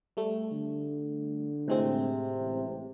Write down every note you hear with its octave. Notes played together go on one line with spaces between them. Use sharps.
G3 A3
D3
A2 C3 G#3 C4
A1